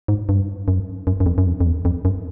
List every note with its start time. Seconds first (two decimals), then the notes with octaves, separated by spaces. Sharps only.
0.08 G#2
0.29 G2
0.68 F#2
1.07 F#2
1.20 F#2
1.26 F2
1.38 F#2
1.46 F2
1.61 F2
1.66 E2
1.85 F2
2.05 F#2